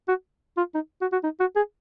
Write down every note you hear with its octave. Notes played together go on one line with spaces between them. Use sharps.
F#4
F4
D#4
F#4
F#4
D#4
F#4
G#4